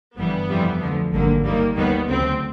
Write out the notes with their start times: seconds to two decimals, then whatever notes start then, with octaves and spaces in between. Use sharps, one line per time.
0.17 G1 G2 E3 G3 B3
0.48 F2 C3 E3 G3
0.80 D2 D3 F3
1.13 G#1 G2 D3 F#3 A#3
1.44 D#2 D#3 G3 A#3
1.77 D#2 D#3 G3 B3
2.08 D2 C#3 F#3 C4